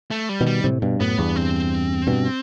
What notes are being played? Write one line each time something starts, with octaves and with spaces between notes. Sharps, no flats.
A3
G3
B2 D#3
G3
A2 C3
G2 B2
F#2 A2 B3
E2 G2
C4
G2 B2